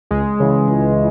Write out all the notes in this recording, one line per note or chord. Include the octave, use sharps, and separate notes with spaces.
C#2 G#3
C#3 E3
C#2